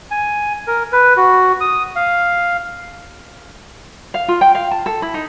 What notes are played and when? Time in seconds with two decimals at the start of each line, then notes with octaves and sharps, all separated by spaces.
0.11 G#5
0.67 A#4
0.93 B4
1.17 F#4
1.61 D#6
1.96 F5
4.14 F5
4.28 F4
4.41 G5
4.55 F5
4.71 A5
4.86 A4
5.02 E4
5.14 D#4